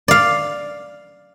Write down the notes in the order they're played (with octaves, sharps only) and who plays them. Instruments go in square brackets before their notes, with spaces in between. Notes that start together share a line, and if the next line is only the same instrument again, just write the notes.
[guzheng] D5 F5